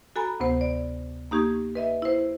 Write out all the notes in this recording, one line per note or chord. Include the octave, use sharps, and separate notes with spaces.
F#4 A4 G#5 A#5 B5
D2 C3 B3 C5
D5
A#3 D#4 G4 C#6 G#6
B4 D#5 E5
E4 C5